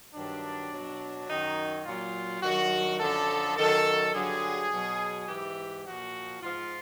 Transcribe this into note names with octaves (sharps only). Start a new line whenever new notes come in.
G2 D#3 F#3 D4
B2 F#3
F#2 D#3 F#3 D#4
A#2 F#3 F4
G2 D#3 F#3 F#4
F#2 D3 F3 A4
F#2 D#3 F#3 A4
G2 D3 F#3 G#4
B2 F#3
G#2 E3 G4
A#2 F3 F#4
G#2 F3 F4